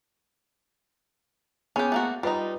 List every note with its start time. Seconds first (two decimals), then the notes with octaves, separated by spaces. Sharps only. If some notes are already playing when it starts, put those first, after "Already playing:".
1.76 B3 C#4 G4 G#4 G#5
1.92 A3 A#3 F#4
2.23 G3 D#4 F4 B4 D#5